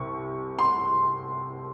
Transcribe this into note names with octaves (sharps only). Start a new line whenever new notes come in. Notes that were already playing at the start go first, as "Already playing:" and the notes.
Already playing: C2 C3 C#6
C6